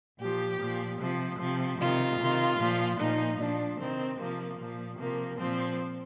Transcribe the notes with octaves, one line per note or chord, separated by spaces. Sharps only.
A#2 F3 G4
A#2 F3
C3 F3
C3 F3
C3 D#3 F4
C3 D#3
A#2 F3
A#2 F3 D#4
A#2 F3 D4
C3 D#3 C4
C3 F3 A#3
A#2 F3
C3 F3 A#3
A#2 F3 C4